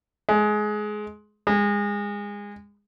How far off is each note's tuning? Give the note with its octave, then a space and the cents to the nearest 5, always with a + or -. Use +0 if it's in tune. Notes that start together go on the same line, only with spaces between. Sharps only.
G#3 +20
G#3 -25